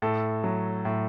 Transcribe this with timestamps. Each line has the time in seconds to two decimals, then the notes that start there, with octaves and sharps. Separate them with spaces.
0.02 A2 A4
0.44 F#3
0.85 A2